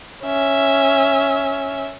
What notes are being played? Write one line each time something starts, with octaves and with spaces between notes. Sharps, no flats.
C#4 E5